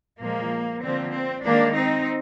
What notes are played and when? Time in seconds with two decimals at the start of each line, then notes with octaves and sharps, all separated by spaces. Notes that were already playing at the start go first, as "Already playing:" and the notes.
0.21 A#2 F3 G#3 A#3
0.83 D3 F3 A#3 C4
1.14 C4
1.44 D#3 G#3 A#3 D4
1.76 C4 D#4